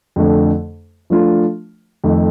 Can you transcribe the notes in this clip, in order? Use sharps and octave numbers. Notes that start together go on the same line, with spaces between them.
F2 D3 A3
F3 A3 D4 F4
F2 D#3 A3